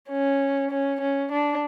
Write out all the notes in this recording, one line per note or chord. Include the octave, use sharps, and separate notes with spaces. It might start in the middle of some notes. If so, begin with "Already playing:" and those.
C#4
C#4
C#4
D4